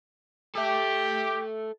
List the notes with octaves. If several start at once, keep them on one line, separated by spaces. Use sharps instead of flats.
G4 A4 E5